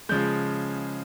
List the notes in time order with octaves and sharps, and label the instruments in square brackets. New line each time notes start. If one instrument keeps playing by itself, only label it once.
[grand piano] C#3 F3 G#3 G6